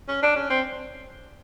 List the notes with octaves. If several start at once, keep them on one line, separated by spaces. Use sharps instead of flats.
C#4
D4
C#4
C4